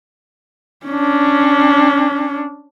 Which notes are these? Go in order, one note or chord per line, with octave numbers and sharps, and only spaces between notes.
C#4 D4